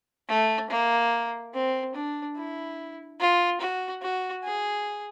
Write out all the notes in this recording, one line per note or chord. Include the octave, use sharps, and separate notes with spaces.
A3
A#3
C4
D4
E4
F4
F#4
F#4
G#4